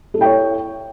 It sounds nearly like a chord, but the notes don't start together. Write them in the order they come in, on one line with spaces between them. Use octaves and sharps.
A4 E4 G5 C#5